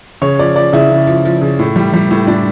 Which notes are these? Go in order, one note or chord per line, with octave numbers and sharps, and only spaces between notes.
C#3 C#5
F3 D5
F3 D5
C#3 E4
C#3
F3
F3
C#3
A2
G3
G3
A2
A2 D4